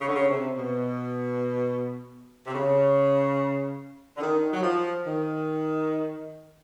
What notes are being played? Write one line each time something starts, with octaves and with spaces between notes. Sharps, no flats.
C#3
D3
C#3
C3
B2
C3
C#3
D3
D#3
F#3
F3
D#3